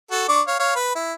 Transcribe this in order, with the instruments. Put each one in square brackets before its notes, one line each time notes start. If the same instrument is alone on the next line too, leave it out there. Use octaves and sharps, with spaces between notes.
[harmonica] F#4 A4
D4 C#6 D6
C#5 F5
C#5 F5
B4
E4